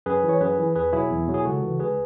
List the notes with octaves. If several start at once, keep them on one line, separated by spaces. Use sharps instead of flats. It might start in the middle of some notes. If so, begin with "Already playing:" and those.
F#2 G#4 B4
E3
C#5
F#2 G#4 B4
E3
E2 G#4 B4
B2 F#3 E4 G#4
E2
B2 F#3
G#4
C#2 F#4 A4
C#3 E3
C#2 G#4 B4